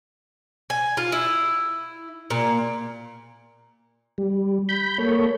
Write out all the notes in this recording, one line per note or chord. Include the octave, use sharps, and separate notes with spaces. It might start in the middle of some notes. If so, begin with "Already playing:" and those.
G#5
F4
E4
A#2
G3
B5 G6
A#3 A4 C#5